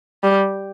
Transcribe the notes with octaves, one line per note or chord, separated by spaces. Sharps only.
G3